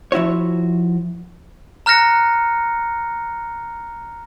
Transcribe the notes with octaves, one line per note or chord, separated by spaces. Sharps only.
F3 E4 F#4 C#5
A#5 F6 F#6 A#6 C#7